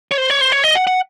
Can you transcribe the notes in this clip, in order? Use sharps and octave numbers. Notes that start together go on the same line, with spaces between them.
C#5
C5
C#5
C5
C#5
D#5
F#5
F#5